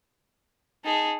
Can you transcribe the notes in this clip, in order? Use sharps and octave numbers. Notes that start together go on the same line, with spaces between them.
D#4 G#4 A5